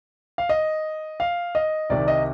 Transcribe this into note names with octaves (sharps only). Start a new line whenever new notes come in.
F5
D#5
F5
D#5
C2 C3 D#3 D5
D#5